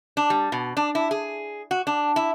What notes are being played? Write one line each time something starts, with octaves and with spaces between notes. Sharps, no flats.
D4
G3
B2
D4
E4
G#4
F#4
D4
E4